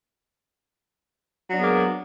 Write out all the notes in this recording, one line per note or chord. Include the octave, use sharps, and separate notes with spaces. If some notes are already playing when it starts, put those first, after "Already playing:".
F#3 G#3 A#3 B3 D4